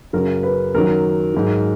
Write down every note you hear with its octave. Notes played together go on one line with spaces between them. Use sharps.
F#2 C#3 F#3 A#4
B4
F#2 D#3 F#3 A#4
G#2 F#3